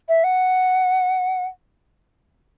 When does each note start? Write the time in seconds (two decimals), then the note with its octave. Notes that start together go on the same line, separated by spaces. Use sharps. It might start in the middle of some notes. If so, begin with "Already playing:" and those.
0.09 E5
0.24 F#5